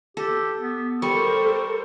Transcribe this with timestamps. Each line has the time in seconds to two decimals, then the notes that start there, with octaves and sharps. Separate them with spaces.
0.17 G4 A4
0.61 B3
1.02 G3 A4 A#4 C5 C#6